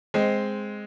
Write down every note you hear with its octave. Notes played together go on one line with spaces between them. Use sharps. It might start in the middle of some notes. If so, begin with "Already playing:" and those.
G#3 C4